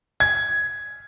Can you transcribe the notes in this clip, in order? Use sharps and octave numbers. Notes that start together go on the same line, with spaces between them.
G#6